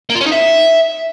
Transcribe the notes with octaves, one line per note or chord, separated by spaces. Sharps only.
A#3
F4
C#4
D#4
E5